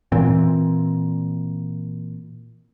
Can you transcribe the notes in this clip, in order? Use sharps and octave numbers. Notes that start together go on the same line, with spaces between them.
A#2 E3 C4